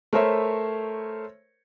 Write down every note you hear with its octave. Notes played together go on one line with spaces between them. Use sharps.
A3 A#4 C5 C#5 E5